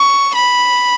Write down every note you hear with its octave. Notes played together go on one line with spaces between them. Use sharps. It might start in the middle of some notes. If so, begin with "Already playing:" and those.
Already playing: C#6
B5